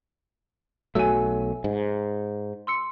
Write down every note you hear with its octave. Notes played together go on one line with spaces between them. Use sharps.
B1 F#3 A3 G#5 E6
G#2
C6 E6 C#7